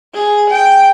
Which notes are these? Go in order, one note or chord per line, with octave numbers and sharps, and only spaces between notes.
G#4
G5